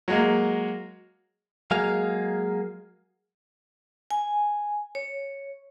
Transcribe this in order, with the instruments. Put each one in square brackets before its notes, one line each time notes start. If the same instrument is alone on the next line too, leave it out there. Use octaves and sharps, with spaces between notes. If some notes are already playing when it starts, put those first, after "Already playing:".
[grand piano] F#3 G#3 A#3
[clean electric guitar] F#3 G#3 A#3 G#4 F5
[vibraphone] G#5
C#5